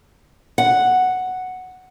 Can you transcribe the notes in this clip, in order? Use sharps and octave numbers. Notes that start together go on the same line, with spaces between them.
F#5